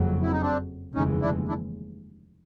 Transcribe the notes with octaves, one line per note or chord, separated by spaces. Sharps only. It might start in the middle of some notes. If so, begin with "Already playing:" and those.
Already playing: F#1 F2 C#3 F#3
E4
D#4
C4 D4
F1 D#2 C#3 E3 G#3 C#4 D#4
D4 E4
D4 E4